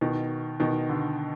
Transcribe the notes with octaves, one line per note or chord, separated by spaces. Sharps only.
B2 D#3
B2 D#3
D3